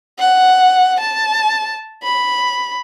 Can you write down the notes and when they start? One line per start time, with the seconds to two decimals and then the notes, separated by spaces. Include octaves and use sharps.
0.19 F#5
1.00 A5
2.03 B5